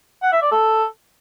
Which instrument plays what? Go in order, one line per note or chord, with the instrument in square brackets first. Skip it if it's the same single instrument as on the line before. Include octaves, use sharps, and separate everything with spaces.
[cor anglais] F#5
E5
D5
A4